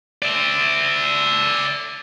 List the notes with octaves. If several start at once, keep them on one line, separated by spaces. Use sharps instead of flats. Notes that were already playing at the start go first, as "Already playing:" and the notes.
D5 E5